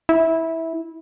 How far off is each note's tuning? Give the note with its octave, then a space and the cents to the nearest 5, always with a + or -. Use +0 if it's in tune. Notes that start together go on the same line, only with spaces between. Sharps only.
E4 -15